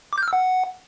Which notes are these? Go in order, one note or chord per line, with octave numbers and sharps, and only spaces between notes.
D6
G6
F6
E6
F#5